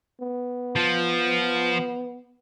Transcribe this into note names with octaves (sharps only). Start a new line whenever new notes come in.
B3
F3